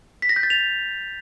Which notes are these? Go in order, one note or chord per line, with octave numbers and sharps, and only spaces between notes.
B6
A#6
G6
A6
F7